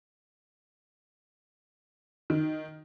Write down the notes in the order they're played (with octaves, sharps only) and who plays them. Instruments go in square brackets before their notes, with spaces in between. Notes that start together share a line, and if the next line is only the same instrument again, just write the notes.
[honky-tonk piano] D#3